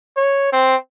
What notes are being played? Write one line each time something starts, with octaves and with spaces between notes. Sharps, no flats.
C#5
C4